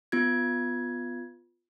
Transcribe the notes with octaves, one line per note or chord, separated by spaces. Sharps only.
B3 F4 G#6